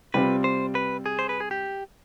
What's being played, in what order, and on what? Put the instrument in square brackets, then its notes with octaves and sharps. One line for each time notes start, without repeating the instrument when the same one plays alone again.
[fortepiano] C3 G3 C4 F4 [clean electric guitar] B4
[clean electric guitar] C5
B4
G#4
C5
B4
G#4
G4